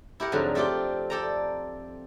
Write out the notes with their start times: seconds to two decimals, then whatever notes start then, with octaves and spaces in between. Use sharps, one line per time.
0.20 E4 G4 A#4 F#5
0.32 F2 G#2 D3 F#3
0.55 A3 C4 F4 G4 D5 G5
1.10 A4 D5 G5 A5 A#5